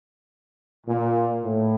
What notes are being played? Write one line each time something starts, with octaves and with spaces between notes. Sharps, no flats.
A#2
A2